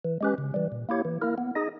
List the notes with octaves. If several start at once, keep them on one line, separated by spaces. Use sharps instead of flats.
E3
G#3 C#4 G4 B4
C#3
E3 G3
A#2
A#3 E4 G4 C#5
E3
A#3 E4 A#4
B3
D#4 G#4 D#5